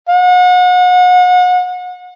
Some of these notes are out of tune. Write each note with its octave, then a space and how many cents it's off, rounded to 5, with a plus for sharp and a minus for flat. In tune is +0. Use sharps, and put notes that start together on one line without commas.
F#5 -35